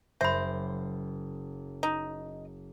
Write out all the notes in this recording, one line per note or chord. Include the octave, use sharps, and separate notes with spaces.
F#1 C5 E5 B5
D#4